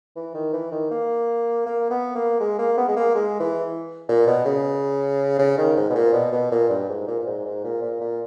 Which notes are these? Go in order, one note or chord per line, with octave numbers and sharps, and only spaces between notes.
E3
D#3
E3
D#3
A#3
A#3
B3
A#3
G#3
A#3
B3
G#3
A#3
G#3
E3
A#2
B2
C#3
C#3
D#3
G#2
B2
A#2
B2
B2
A#2
G2
G#2
A#2
A#2
G#2
G#2
A#2
A#2
A#2